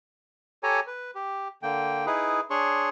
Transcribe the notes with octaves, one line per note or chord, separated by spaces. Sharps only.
G4 A4 C#5 G#5 A#5
B4
G4
D3 A#3 G5
D#4 E4 G#4 B4
D4 G#4 C#5 C6 C#6